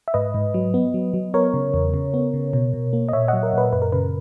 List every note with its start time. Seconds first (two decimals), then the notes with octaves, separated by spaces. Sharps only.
0.08 E5
0.14 G#2 B4 D#5
0.34 G#2
0.54 F#3
0.74 B3
0.94 F#3
1.14 F#3
1.34 B3 A#4 C#5
1.54 C#3
1.74 E2
1.94 C#3
2.14 B3
2.34 C#3
2.53 B2
2.73 B2
2.93 A#3
3.09 D#5
3.13 A#2 C#5 E5
3.28 F#3 D#5 F#5
3.43 A#4
3.53 A#2 B4
3.73 F#2 B4
3.82 A#4
3.92 C#3 B4